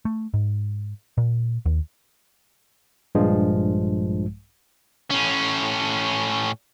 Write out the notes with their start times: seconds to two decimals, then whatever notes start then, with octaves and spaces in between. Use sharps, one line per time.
0.05 A3
0.34 G#2
1.18 A#2
1.66 D#2
3.15 A#1 G2 F3 G#3
5.11 A2 C#4